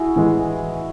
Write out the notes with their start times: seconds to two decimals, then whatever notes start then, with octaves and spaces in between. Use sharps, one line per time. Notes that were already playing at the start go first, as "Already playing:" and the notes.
Already playing: E4 F#4 G#4
0.16 A2 E3 G#3